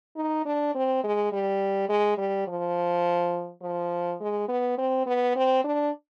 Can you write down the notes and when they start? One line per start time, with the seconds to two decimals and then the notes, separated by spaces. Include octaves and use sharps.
0.16 D#4
0.45 D4
0.75 C4
1.04 G#3
1.32 G3
1.89 G#3
2.18 G3
2.48 F3
3.62 F3
4.21 G#3
4.48 B3
4.78 C4
5.06 B3
5.36 C4
5.64 D4